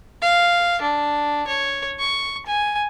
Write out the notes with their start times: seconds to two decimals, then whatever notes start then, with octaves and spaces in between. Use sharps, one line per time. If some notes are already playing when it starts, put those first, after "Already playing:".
0.22 F5
0.82 D4
1.47 C#5
1.99 C#6
2.46 G#5